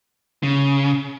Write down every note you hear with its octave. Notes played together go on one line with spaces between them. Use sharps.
C#3